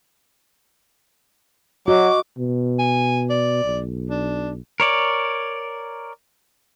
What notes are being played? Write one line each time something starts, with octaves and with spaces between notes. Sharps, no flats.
F#3 F#4 D#5 D6
B2
G#5
D5
B1
D4
A#4 C#5 D5